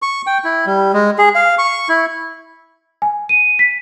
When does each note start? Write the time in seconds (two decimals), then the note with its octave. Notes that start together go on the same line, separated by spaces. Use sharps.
0.02 C#6
0.27 G5
0.44 E4
0.66 G3
0.93 G#3
1.18 G#4
1.35 F5
1.58 C#6
1.89 E4
3.02 G#5
3.29 D#7
3.59 B6